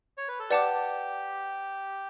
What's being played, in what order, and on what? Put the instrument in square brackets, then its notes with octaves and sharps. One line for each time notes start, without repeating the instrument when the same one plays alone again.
[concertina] C#5
B4
A4
[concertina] G4 [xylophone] B4 D5 F#5 A5 D6